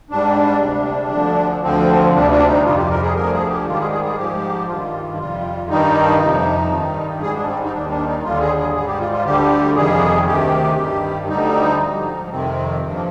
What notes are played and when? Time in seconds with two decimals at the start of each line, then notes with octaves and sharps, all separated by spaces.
0.11 G#2 G3 D4
0.61 D2 C3 G3
1.12 D2 D3 F3
1.63 D2 D3 F3 C4
2.14 D2 C3 G3 D4
2.31 D4
2.48 D#4
2.65 F2 C3 G3 F4
2.77 G4
2.90 A#4
3.02 G#4
3.16 D2 D3 F3 A#4
3.32 G#4
3.49 G4
3.66 G#2 D#3 G3 F4
3.73 G4
3.79 G#4
3.92 G#4
4.04 G#4
4.17 G#2 F3 G4
4.68 G2 D#3 G3 F4
5.19 F2 C3 G3 F4
5.69 G2 D#3 G3 D#4
6.20 F2 C3 F3
6.71 G2 D#3 G3
7.22 G#2 G3 G#4
7.34 D4
7.47 C4
7.64 D#4
7.73 D#2 D#3 G3 D4
7.90 D4
8.06 D#4
8.23 D#2 D3 G3 F4
8.40 G#4
8.57 G#4
8.74 G#2 G3 G#4
8.87 G4
9.00 F4
9.12 F4
9.25 D2 D3 G3 G4
9.76 F2 C3 D#3 G3 G#4
10.26 D2 C3 D#3 G4
10.78 G2 D#3 G3
11.28 D2 D3 G3 D#4
11.79 G#2 F3
12.30 F2 C3 D#3 C4
12.80 G2 F3 C4
12.93 A#3